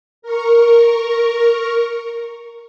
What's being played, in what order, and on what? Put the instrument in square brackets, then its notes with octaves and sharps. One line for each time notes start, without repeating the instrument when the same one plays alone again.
[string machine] A#4 C#6